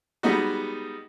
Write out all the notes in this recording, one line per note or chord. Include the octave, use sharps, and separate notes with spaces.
G3 G#3 B3 D#4 F#4